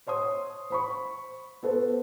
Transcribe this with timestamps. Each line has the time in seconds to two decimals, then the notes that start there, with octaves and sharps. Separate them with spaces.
0.07 C5 C#5 C6 D#6
0.70 C5 B5 C#6
1.63 B3 A4 B4 C5